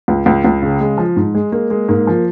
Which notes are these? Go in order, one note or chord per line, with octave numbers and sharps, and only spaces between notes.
C#2
C#2
C#2
C#3
G#3
F3
G#2
G#3
G#3 A#3
G#3
G#2 A#3
F3